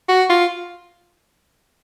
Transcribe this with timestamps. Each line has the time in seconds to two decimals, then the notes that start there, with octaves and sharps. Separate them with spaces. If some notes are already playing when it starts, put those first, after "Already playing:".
0.09 F#4
0.30 F4